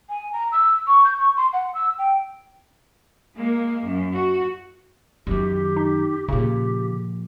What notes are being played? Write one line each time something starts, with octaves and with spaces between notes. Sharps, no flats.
G#5
A#5
E6
C#6
G6
C#6
C6
F#5
E6
G5
G#3 A#3
F#2
F#4
F#2 D#3 G4
D#4
A#2 C#3 F3 G4